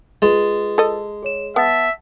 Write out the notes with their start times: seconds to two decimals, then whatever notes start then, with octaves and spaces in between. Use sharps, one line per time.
0.22 G#3 F4 B4 A6
0.78 A4 D#5
1.23 G#4 C#5 E7
1.56 B3 E5 F#5 A5 A6